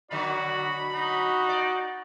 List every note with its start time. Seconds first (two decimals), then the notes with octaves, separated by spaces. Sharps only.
0.11 B2 D3 F#3 F#4 D5 B5
0.94 D#4 F#4
1.49 D5